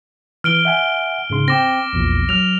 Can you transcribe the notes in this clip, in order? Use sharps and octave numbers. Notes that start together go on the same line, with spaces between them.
E3 F6 D7 G7
E5 F#5 G#5
G#2 C#3 C6
C4 G5 D6 A#6
A#1 E2 A#2
F#3 F6 F7